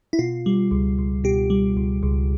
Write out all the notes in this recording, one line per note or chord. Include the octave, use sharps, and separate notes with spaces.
E4
B2 F4
G3
C#2
C#2
B2 G4
G3
C#2
C#2